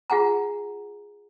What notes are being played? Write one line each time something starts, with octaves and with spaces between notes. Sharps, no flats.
F4 G#4 F#5 G#5 A#5